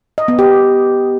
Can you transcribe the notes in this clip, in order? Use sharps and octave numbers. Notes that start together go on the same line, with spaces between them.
D#5
B3
G4